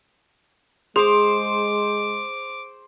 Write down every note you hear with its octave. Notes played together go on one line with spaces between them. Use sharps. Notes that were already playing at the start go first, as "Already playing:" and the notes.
G#3 G#4 C5 D6 D7